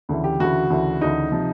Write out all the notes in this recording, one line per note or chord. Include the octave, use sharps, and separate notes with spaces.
D2 C#3 E3
G4
D2 C#3 E3 F#4
D2 C#3 E3
D2 C#3 E3 D#4
C3 F3